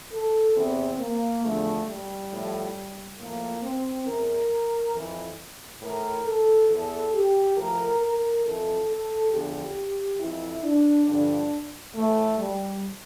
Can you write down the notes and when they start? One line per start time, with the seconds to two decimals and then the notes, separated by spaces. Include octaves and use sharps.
0.12 A4
0.55 E2 C3 E3 C4
0.99 A#3
1.43 E2 D3 F3 A3
1.87 G3
2.30 A2 F3
3.18 A2 F3 A#3
3.62 C4
4.05 E2 E3 A#4
4.93 F2 E3
5.81 A2 E3 A#4
6.25 A4
6.68 E2 E3 A4
7.13 G4
7.56 A2 F3 A#4
8.00 A#4
8.44 F2 E3 A4
8.87 A4
9.31 E2 D3 F3 G4
10.19 F2 E3 E4
10.63 D4
11.07 G2 D3 F3 D4
11.94 A2 E3 A3
12.38 G3